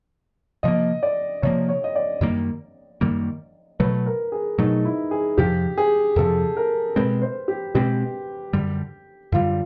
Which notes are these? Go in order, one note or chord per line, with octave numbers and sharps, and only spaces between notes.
C3 F3 A#3 D#5
D5
C3 F3 A#3 C#5
C#5
D#5
D5
F#2 D#3 G3 A#3
F#2 D#3 G3 A#3
B2 F#3 A3 B4
A#4
G#4
B2 F#3 A3 D#4
E4
G#4
F2 C3 F3 G4
G#4
F2 C3 F3 A4
A#4
B2 G#3 C4 B4
C5
G4
B2 G#3 C4 G4
F#2 D3 G3
F#2 D3 G3 F4